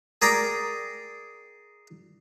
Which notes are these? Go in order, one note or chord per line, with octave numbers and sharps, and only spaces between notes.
G#4 A#4 D5 G5 A#5